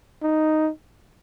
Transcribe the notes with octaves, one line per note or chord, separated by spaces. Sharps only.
D#4